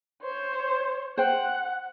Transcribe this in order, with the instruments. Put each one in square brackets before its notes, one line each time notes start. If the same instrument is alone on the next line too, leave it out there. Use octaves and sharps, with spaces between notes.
[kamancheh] C5 C#5
[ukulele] C5 G5 [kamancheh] F#5